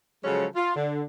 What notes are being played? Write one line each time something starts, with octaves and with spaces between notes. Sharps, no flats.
C#3 F3 F#3 G#3 C#4 A4
F4
D3